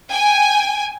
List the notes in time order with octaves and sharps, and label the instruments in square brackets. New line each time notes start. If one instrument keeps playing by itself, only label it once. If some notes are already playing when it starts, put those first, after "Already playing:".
[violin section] G5 G#5